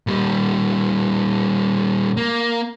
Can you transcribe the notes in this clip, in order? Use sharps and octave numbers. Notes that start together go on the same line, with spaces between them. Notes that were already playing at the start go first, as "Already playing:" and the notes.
A#2 G3
A#3